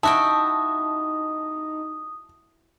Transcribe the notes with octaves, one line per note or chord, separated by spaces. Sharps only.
D#4 E4 F#4 G5 A5 D#6